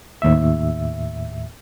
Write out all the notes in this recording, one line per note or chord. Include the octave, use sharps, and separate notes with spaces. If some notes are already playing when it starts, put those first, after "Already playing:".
D#2 A2 E5